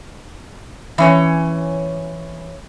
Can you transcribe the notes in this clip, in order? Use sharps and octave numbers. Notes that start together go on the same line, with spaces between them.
E3 C#4 C#5